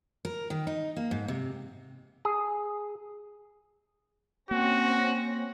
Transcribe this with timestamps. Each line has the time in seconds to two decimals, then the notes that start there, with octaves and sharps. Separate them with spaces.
0.25 A#4
0.50 D#3
0.67 D#4
0.96 A#3
1.11 G#2
1.28 C3
2.25 G#4
4.51 A#3 C4 C#4 F#4 A#6